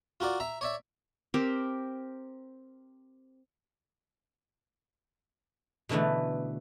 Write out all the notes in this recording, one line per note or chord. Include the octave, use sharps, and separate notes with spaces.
F4 F#4 A#4 D5
E5 A#5
C#5 D5 E5
C4 G4 A#4
B2 D3 E3 A3 B3